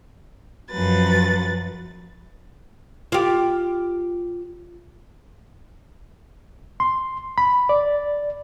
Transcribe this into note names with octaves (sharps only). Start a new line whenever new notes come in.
F#2 F3 F#3 B4 A6
F4 G4
C6
B5
D5